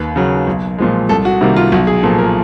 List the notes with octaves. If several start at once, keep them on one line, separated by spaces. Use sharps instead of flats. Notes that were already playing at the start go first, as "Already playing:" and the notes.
Already playing: D#2 B4
C#3 F#3
B1
A#2 F3 G#3
C2 A4
F#4
C3 D#3 G3 A#3
F4
B1 F#4
G#4
A#2 F3 A4
A#4